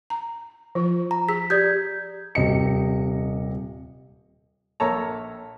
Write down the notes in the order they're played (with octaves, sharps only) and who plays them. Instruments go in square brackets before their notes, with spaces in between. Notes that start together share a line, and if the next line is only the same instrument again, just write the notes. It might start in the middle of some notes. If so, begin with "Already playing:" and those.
[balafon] A#5
F3 F4
[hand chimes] A#5
[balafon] G#4 A#5 [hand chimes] B6
[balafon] G4 D5 [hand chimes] G6 G#6
[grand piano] D#1 C3 D#5 C#7
[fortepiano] A#1 A#3 A4 C#5 A5 A#5